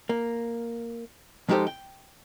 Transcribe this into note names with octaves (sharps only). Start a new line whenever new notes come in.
A#3
F3 G#3 D#4 G4 A4 C5
G5